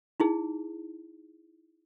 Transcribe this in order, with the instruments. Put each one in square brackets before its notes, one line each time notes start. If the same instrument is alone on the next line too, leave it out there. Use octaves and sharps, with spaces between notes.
[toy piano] D#4 E4 G#4